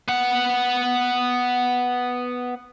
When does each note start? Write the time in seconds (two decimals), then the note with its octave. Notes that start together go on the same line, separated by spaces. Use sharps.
0.08 B3 F#5